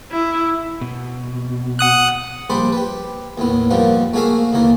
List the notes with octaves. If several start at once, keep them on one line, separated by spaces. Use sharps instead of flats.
E4
B2
F#5 D#6 F#6
A#1 G3 D4 C5 D5 B5
G4 B4
D#2 A2 B3
F#2 B2 F3 G3 A#3 B3
A3 A#3 F#4 G#4 E5 F5
D#2 D3 E3 A#3 A#4